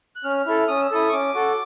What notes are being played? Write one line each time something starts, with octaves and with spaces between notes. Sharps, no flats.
F#6
C#4 F6
E4 A4
C#4 D#6
E6
E4 A4 D#6
C#6
C#4 D6
F#4 A4